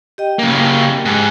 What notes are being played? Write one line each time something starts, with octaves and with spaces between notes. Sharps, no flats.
G4 D#5 G5
C#3 A#3
G#2